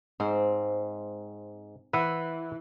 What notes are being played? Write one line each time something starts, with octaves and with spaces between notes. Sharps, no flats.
G#2 C4
E3 B4 E5 F#5